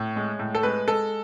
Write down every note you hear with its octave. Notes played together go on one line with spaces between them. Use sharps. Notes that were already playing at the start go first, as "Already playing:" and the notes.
Already playing: A2 C#5
G#3
A2
A4
G#3 B4
G#3 A4